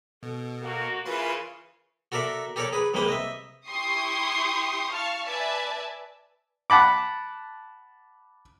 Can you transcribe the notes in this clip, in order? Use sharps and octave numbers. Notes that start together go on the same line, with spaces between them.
B2 A4
A#3 F#4
C#3 E3 F4 A#4 B4 C6
F#4 A4 A#4 D5 E5
G4 A4 A#4 C#5 D5
G#4 B4
C2 G3 G#3 A#3 B4 G5
D#5 E5
E4 G4 C6 C#6 D#6
F5 A5 C#6 F6
B4 D5 E5 G#5 A5
F#5 A5 B5 D6